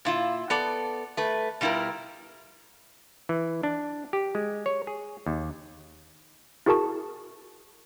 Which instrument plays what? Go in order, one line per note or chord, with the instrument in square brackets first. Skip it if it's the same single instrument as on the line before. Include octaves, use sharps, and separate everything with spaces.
[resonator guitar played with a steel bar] A#2 E4 F4
B3 A4 D5
A3 B4
B2 G3 E4 F4 A#4
[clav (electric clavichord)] E3
D4
G4
G#3
C#5
G#4
D#2
[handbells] E4 F#4 G#4 A#4 A5 C#6